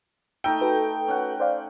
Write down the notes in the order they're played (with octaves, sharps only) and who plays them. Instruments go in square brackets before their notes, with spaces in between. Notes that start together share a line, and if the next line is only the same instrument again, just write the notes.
[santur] A3 D#4 E6 [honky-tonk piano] G5
[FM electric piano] F#4 A4 B4
[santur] C#4 F#5
[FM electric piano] C5 D5 F5